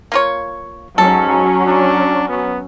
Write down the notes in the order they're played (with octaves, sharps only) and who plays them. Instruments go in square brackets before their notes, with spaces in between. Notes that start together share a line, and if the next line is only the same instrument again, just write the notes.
[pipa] A#3 F4 C#5
[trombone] G#2 [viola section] F#3 C#4 [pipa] A4
[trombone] D4
B3